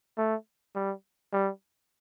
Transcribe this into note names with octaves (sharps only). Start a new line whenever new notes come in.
A3
G3
G3